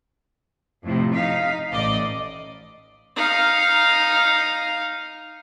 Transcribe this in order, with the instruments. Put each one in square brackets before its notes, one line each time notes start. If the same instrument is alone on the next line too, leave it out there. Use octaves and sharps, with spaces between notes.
[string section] F2 A2 C3
D#4 F5 B6
A1 D5 D#5
[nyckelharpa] D#4 F5